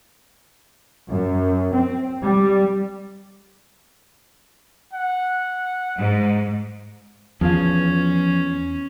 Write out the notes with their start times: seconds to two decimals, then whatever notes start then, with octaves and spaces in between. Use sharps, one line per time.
1.09 F#2
1.73 C4
2.22 G3
4.93 F#5
5.97 G#2
7.41 E2 F3 C#4 F4 F5